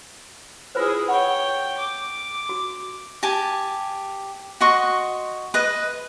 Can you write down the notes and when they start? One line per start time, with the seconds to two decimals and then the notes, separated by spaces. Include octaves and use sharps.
0.75 E4 F4 G#4 B4 C5
1.08 C#5 F#5 G5 B5
1.77 D6
2.49 F#4
3.23 G4 G#5 A5
4.61 F#4 D#5 C6 C#6
5.54 B4 D#5